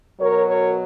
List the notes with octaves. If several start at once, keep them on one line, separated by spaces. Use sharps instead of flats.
B2 F#3 A#4 C#5
A#4 C#5